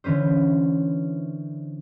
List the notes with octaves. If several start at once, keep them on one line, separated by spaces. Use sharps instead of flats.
D3 E3 C#4 B4 C5